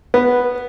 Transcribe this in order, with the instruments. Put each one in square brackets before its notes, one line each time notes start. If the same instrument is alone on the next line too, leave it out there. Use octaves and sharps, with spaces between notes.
[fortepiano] B3